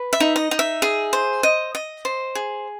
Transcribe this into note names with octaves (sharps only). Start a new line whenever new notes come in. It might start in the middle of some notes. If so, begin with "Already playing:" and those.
Already playing: B4
E5
D#4
D#5
D#4
E5
G#4
C5
D#5
D#5
C5
G#4